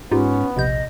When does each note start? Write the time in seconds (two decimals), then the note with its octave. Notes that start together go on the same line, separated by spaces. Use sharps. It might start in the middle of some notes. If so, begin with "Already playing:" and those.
0.11 G#2 B3 C#4 D#4 F4 G4
0.56 A#1 D#2 C3 D#5 G6